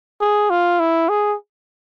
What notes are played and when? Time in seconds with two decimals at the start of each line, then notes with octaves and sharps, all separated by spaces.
0.21 G#4
0.50 F4
0.80 E4
1.09 G#4